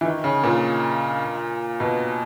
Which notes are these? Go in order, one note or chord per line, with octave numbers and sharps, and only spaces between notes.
E3
D#3
C#3
A#2
B2